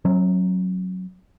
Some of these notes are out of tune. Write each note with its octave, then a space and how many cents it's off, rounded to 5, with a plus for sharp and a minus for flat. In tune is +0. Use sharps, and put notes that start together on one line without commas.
F#3 +0 C#4 -40